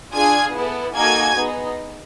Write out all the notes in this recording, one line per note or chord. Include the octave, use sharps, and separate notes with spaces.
D4 F4 G#4 G#5 G#6
B3 E4 A4
A#3 D#4 F#4 A4 G#5 G#6
B3 D#4 G#4